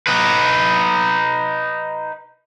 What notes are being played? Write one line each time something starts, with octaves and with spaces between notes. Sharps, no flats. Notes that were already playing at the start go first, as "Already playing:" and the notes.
D#4 B4